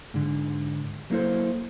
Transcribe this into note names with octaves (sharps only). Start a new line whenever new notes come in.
G#2 D3
F#3 A3 A#3 E4 A4 C5